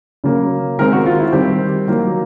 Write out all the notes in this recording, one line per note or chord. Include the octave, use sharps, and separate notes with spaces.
C#3 F#3 A#3
D#3 G#3 C4 A#4
F#4
F4
E4
D#3 G3 C4 G4
D#3 F#3 A#3